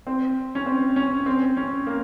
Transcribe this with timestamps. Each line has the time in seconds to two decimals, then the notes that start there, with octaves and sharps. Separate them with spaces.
0.07 C4
0.55 C#4
0.66 C4
0.96 C#4
1.26 C4
1.57 C#4
1.87 A#3